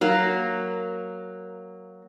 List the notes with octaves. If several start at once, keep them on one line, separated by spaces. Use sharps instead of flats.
F#3 A#3